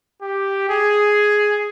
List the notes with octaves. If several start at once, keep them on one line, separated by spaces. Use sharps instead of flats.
G4
G#4